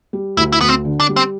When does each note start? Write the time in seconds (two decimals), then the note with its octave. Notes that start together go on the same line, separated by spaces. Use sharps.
0.13 G3
0.37 D2 E4
0.52 E4
0.61 D2 B3
0.69 C4
0.85 D3
1.00 D4
1.09 G3
1.16 C4